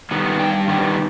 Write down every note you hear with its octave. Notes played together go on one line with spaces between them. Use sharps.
D#3 G3 B3
G2 G5
D#3 G3 B3